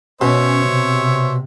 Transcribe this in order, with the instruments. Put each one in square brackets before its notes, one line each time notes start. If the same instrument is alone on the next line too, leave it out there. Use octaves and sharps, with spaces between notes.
[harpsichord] B2 [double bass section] C#4 [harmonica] C5 C#5 E5
[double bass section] C3